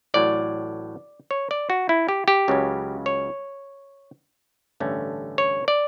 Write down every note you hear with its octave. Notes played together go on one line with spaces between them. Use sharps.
A1 A2 F#3 D5
C#5
D5
F#4
E4
G4
G4
C#2 C#3 F#3 C#4
C#5
A1 G2 D3 A3 C#4
C#5
D5